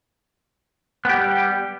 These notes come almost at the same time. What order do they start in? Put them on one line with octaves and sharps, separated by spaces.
B3 G4 G3